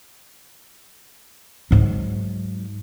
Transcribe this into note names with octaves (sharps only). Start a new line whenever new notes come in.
G#2 F#3